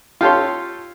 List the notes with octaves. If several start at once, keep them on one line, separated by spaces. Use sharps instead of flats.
F4 G4 A4 C#5 C6